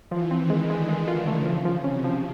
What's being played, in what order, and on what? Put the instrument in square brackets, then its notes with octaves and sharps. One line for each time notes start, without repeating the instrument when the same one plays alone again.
[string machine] E3 [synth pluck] F3
[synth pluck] C4
[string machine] D#3
[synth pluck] G#3
[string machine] D3 [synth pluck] G#3
[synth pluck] G#3
F4
[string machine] C#3 [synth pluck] A3
[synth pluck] F3
F3
[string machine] C3 [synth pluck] C#4
[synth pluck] F3